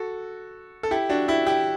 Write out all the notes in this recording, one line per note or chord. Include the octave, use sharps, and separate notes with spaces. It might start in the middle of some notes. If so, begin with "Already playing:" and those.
Already playing: F#4 A4
A4
E4 G4
D4 F#4
E4 G4
E4 G4